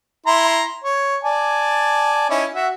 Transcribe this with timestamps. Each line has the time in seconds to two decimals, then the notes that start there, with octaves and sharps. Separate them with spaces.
0.27 E4 A#5 C6
0.84 C#5
1.23 D5 G#5 A5
2.30 C#4 D#4 E4
2.54 F#4 E5